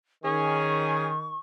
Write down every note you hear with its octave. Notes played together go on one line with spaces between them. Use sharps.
D#3 C#4 G#4 C#6